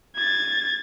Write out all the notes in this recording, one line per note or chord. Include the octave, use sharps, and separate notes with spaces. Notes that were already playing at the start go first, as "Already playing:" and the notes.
G#6 A6